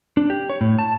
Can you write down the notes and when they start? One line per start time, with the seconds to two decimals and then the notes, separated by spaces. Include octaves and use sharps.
0.17 D4
0.30 G4
0.50 C#5
0.61 A2
0.79 A5